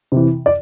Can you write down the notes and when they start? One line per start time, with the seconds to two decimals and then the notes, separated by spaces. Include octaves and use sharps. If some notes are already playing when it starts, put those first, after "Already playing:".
0.12 C3 E3
0.46 D5